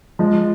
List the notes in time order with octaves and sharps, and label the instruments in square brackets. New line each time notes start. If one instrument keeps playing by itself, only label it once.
[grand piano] F3 G#3